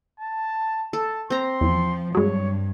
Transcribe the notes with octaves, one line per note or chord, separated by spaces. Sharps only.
A5
A4 A5
C4 A#5 C6
E2 F3
G2 F#3 G#3 C#5